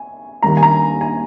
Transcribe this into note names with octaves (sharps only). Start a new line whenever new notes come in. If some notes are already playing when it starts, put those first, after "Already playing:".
Already playing: G#5
D#2 D#3 G3 A#3 A#5
G#5
A#5
G#5